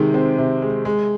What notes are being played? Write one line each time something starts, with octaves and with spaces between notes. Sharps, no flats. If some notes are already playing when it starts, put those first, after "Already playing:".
Already playing: C3 D#3 G#3
C4
C3
G#3
G#3